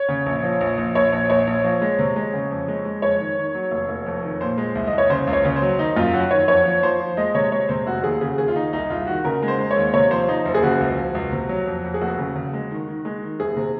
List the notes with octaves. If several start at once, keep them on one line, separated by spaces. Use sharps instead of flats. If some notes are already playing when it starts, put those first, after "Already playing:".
Already playing: C#5
C#3
A#1
F3
A#1
A#1
A#1 C#5
A#1
A#1 C#5
A#1
F3
G#3
C3
G#3
C#3
F2
G#3
G#3
F2 C#5
D#3
D#3
F#3
F1
F1
F2
D#3
A#2 C5
G#3
C2
D#5
C2
C#5
C#3 C5
C#2
C#5
C#3
C5
F#3
D#3 D#4
F#2 F4
F#3 F#4
D#3 C#5
F2 C#5
F3
F3 C5
F3
G#3 D#5
C3 C#5
G#3 C#5
C3 C5
F1 F#4
D#2 G#4
C#3 G#4
D#2 G#4
F4
D#3 D#4
C2 D#4
C2 F4
D#3 F#4
C#3 A#4
G#3
C5
G#3
C#5
D#2
C3 C#5
F3 C5
F3 D#4
F#1
G#4
C#3 F#4
C#2
F3
C#2
C3
F#3
F2
F2
G#4
F1 F#4
C#3
C#3
G#3
D#3
D#3
G#3
D#3
F#1 G#4
C3